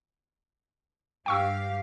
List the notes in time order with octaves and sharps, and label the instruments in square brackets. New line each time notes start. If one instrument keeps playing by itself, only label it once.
[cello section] G2 G4 F5 [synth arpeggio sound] G5 C#6 E6